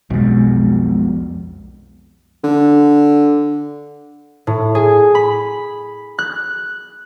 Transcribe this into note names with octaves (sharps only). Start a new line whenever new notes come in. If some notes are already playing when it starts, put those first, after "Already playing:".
B1 F2 B2 G#3
D3
A2
G#4
B5
F#6